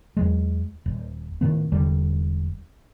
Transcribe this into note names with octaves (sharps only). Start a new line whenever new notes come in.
E2 F#3 G#3
D#1
A2 D#3 B3
E1 E2 D3 G3